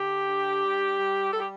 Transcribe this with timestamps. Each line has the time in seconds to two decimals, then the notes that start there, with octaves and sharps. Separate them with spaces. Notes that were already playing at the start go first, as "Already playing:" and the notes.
Already playing: D3 G4
0.28 D4
0.63 G3
0.98 G3
1.33 G3 A4
1.40 G4